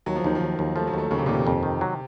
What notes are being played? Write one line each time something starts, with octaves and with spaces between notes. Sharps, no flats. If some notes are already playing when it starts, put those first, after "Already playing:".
D#2 F#3
F3
D#2 D#3
F3
D#2
D#2
F3 A3
F#3
D#2 A3
D#2 C#3
C3
A#2
D#2 C3
F2
D#3
F#3